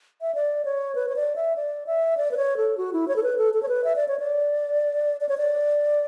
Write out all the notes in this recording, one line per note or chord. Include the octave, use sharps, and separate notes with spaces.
E5
D5
C#5
B4
C#5
D5
E5
D5
E5
D5
B4
C#5
A4
F#4
E4
C#5
A4
B4
A4
A4
C#5
B4
E5
D5
C#5
D5
D5
C#5
D5